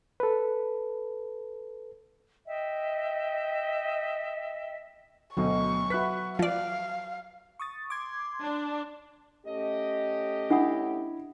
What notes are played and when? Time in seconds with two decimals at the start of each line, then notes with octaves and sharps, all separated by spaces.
0.20 A4 B4
2.46 D#5 E5 G5
5.37 D2 B2 F#3 D#5 C#6
5.90 F#4 B4 E5 F#6 B6
6.39 F3 D5 F5
7.59 C#6 D#6 A6
7.90 C6 D6 G#6
8.41 D4
9.46 A3 C#4 G4 D#5
10.50 D4 E4 F#5 D#6